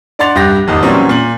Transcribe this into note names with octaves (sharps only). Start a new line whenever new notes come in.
D4 D5 F#5 C6 A6 F7
C2 G2 G4 A#6
D#1 G#1 D#2 D#4
A#2 E3 F#3 G3 C4 C#4
A#2 F#7